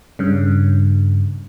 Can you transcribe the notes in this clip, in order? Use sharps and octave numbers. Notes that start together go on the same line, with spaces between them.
G2 C#3